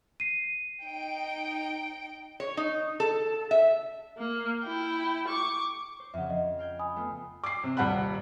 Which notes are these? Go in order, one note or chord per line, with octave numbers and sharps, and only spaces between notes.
C7 D#7
D#4 G5 D7
C#5
D#4
A4
E5
A#3
E4 G5
C#6 D6
C5
F2 C#3 E5 F#5
F3 D#5
F5 G5 G#6
G#5 B5 D#6
A3 B3 F4
D6 C7
C3
D#1 G3 F#5 A5 B5 F#6